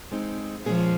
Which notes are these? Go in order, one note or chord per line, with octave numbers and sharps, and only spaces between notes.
G#3 C4 D#4
A#2 F3 G#3 C#4 G#4